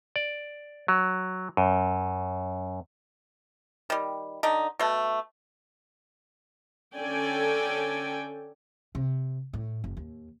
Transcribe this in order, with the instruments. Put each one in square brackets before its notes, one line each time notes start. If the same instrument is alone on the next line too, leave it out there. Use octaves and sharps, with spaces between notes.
[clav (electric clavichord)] D5
F#3
F#2
[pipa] D#3 G3
D3 D#4
B2 A3
[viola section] D3 C#4 A4 D5 G5 G#5
[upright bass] C3
A2
F#1
D#2